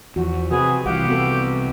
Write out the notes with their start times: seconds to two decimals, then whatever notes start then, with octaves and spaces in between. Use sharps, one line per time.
0.16 E2 F3 F#4
0.51 C3 F#4 G#4 B4
0.86 C2 E3 G4 F5 F#5
1.07 B3 F#4 A4